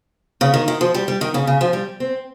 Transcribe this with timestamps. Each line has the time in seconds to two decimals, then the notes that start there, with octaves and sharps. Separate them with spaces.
0.41 C#3
0.54 D#3
0.68 D#3
0.81 F3
0.94 G3
1.08 G3
1.21 D#3
1.34 C#3
1.47 C#3
1.61 F3
1.73 G3
2.00 C4